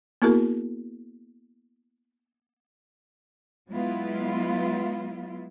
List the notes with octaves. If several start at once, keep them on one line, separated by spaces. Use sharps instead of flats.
A#3 B3 E4 F#4 G#4 A#4
F#3 G#3 B3 E4 F4